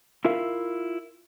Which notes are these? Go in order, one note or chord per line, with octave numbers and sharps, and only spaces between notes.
E4 F4 A#4 E5 F5